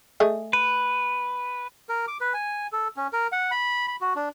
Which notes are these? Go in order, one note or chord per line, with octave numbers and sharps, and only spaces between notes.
A3 G#4 D#5
B4
A#4
D6
B4
G#5
A4
C#4
A#4
F#5
B5
B5
F#4
D4